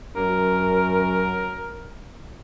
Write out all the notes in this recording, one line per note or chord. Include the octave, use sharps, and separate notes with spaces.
F#2 A#4